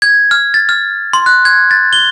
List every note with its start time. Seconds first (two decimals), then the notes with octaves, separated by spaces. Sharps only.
0.02 G#6
0.31 F6
0.54 A6
0.69 F6
1.13 C6
1.26 F#6
1.45 G#6
1.71 A6
1.93 G7